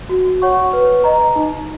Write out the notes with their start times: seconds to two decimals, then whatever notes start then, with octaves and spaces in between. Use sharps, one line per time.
0.09 F#4
0.42 C#5 F#5 C#6
0.73 B4
1.04 D#5 A#5
1.36 D#4